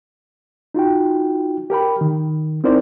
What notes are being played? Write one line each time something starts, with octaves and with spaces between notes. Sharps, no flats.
D#4 F4 F#4 G5
G4 A#4 G5 B5
D#3
C4 D#4 E4 A#4 C5 D5